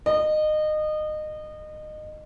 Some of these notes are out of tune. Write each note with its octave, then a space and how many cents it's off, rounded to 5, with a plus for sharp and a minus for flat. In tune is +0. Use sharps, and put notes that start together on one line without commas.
D#5 -25